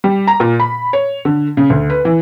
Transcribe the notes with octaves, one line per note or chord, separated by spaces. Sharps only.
G3
A#5
A#2
B5
C#5
D3
C#3
D2
B4
E3